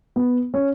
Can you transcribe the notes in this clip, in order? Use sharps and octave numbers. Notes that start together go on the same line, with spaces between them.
B3
C#4